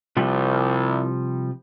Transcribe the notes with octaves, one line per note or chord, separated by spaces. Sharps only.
C2 C3 F3 G3